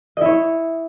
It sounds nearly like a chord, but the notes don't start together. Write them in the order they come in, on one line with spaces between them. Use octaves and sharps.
D#5 E4 C#5